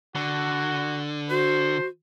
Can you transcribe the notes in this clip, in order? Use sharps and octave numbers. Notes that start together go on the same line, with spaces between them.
D3 F#4
F#4 C5